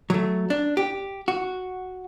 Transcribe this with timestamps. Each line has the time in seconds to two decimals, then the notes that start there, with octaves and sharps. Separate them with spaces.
0.10 F#3 A3
0.50 D4
0.77 G4
1.28 F#4